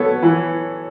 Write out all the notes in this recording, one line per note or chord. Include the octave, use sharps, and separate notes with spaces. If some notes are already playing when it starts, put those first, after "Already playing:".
Already playing: B3 F#4 A4 C#5
E3